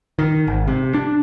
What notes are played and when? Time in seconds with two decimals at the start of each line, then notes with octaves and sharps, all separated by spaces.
0.19 D#3
0.47 G#1
0.68 C3
0.94 D4